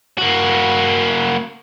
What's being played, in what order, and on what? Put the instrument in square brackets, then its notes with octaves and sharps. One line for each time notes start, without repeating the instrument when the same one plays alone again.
[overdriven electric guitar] A#3 F#4